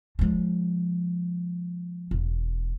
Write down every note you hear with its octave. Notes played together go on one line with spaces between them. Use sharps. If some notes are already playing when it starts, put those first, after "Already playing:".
F3 G#3
E1